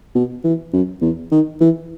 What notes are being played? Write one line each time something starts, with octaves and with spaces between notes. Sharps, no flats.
B2
E3
F#2
E2
D#3
E3